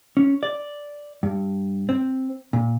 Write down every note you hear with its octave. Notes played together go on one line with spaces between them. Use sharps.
C#4
D5
G2
C4
A#2